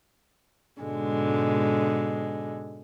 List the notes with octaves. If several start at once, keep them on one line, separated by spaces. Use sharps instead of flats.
G#2 B2 D3 G#3